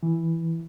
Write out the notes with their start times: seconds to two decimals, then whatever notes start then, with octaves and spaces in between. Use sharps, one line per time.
0.03 E3